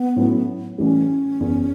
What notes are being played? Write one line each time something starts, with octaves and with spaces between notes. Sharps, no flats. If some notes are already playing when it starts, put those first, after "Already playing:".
Already playing: B3
A2 F#3 C#4 E4
A1 A2 E3 G3 C#4
F#1 E2 C#3